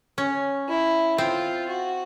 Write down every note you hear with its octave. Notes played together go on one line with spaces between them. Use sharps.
C#4
E4
C4 F4
F#4